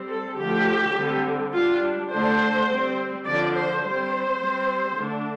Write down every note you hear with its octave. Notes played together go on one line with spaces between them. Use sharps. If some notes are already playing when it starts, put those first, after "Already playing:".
Already playing: G3 C4
A4
D3 F3 A3 G4
D3 G3 C4
G3 D4 F4
D3 A3 D4 C5
G3 C4
D3 F3 D4 D5
C5
G3 C4 C5
G3 C4
D3 A3 D4